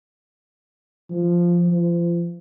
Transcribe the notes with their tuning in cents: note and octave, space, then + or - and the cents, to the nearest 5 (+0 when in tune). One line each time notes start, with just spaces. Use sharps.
F3 -5
F3 -30